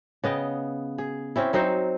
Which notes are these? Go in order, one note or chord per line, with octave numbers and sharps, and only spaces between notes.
C#3 B3 D#5 G5
G#4
C4 C#4 E4
F#3 C4 D#4 C5